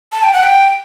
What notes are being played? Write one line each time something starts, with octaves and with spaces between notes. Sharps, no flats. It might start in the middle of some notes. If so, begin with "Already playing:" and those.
A5
G5
F#5
G5